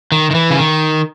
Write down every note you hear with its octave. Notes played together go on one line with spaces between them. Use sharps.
D#3
D#3
E3
C#3
D#3